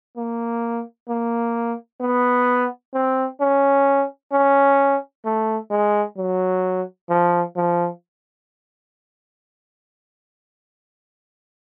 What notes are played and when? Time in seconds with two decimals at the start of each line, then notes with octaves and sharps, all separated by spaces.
0.17 A#3
1.09 A#3
2.01 B3
2.94 C4
3.41 C#4
4.32 C#4
5.25 A3
5.71 G#3
6.17 F#3
7.10 F3
7.57 F3